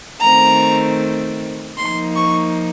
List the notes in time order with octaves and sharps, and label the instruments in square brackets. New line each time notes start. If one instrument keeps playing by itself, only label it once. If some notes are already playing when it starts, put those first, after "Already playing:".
[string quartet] D#3 A3 C4 A#5
F3 A#3 D#4 C6
C#6